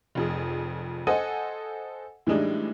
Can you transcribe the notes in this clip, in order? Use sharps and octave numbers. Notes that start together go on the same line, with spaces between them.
F1 F2 G#4
A4 C5 D#5 F#5 G#5
A2 E3 G3 G#3 D4 D#4